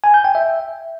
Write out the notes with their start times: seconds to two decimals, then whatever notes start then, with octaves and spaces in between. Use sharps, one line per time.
0.04 G#5
0.14 G6
0.24 G5
0.35 E5